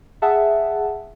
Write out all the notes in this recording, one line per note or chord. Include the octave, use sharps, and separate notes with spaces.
G#4 E5 F#5 A5